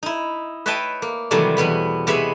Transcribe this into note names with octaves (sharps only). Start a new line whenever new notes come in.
D#4 E4
B4 C#5 D#5 E5 G5 A5
A#3
C3 D#3 E3 F#3 G3 A3
E2 B2 B3 B5
C3 G#3 B3 C#5 E5 B5